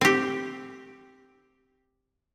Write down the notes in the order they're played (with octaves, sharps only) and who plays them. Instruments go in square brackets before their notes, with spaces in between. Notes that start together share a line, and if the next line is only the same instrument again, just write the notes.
[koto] C4 G4